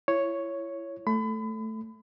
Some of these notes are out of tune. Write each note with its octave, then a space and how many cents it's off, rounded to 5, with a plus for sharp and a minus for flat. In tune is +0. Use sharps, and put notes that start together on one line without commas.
E4 +30 C#5 +0
A3 +0 B5 +35